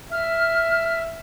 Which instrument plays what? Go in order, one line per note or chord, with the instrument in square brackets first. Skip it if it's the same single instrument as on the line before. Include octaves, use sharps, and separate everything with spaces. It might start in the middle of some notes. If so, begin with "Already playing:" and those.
[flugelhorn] E5 [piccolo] F6